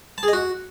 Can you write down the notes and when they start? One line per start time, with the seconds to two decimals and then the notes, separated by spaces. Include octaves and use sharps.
0.18 A5
0.23 G#4
0.28 D#5
0.33 F#4